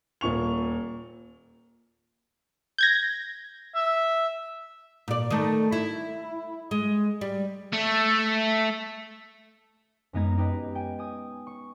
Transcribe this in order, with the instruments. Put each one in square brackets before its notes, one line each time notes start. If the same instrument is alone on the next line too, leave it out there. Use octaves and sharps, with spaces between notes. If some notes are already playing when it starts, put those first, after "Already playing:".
[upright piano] D#1 A#2 C#6 F7
[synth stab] G6 G#6 A#6
[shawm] E5
[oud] A#2 D5
D#3 A3
E4
G#3
G3
[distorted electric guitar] A3
[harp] F#2 G#3 B3 D#4 A#5 G#6
D#4 G4 B4 D#5
G5 G#5
G#5 D#6
C#6